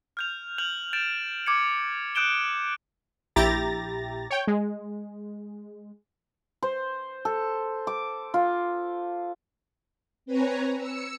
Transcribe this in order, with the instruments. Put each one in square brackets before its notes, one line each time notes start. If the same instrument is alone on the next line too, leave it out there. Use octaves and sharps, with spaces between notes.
[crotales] F6 G6 F7
F6 G6 F7 F#7
G6 A6 D7 E7
D6 G#6 C#7
D#6 F#6 G6 D7 E7 G7
[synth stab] A#1 E4 G4 A#5 A6 A#6
C#5 G5
G#3
[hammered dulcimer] C5
A4
D6
F4
[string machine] C4 B4 C#5 G#5 A#5
E6 C#7